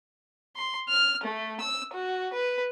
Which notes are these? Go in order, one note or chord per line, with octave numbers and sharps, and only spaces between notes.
C6
F6
A3
E6
F#4
B4